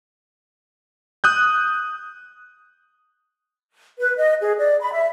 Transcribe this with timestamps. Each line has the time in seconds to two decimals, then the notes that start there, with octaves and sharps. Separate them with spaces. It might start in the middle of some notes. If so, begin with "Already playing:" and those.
1.24 D#6 F#6 G6
3.98 B4
4.17 D#5
4.41 G#4
4.58 D5
4.80 B5
4.93 E5